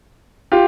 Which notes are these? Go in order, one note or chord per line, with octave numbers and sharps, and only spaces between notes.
F4 G4